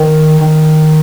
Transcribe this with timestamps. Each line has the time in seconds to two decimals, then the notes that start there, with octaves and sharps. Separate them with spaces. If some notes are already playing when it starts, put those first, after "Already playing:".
Already playing: D#3
0.41 D#3